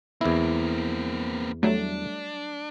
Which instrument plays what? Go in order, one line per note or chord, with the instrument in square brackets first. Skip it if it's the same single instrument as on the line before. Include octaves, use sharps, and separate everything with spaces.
[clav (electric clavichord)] E2 E4 [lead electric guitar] A#3 C4
[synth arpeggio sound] F#3 G3 A3 [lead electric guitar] D4